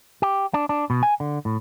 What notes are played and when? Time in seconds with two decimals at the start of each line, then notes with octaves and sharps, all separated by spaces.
0.22 G4
0.54 D4
0.69 D4
0.90 B2
1.03 G#5
1.20 D3
1.45 A2